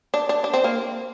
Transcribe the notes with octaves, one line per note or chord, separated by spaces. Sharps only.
D4
D4
D4
C4
A#3